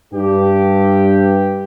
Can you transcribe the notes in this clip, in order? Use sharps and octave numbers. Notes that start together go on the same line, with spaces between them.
G2 G4